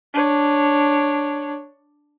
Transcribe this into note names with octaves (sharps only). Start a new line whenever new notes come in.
D4 C#5